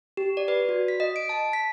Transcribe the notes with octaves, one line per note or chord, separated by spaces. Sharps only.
G4
D5
B4
F#4
B6
D#5
D7
A5
B6